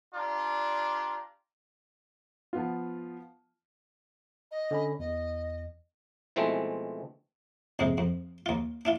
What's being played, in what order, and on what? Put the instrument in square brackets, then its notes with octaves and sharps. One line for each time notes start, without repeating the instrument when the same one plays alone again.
[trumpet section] D4 F4 G4 D5 A#5
[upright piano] F3 B3 F4
[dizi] D#5
[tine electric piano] D3 C#4 B5
[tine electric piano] E2 [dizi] D#5
[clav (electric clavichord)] B2 E3 F3 G#3 A3 C4
[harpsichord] A#1 F2 G#2 C3 G#3
F2
D#2 F4
D4 E4 F4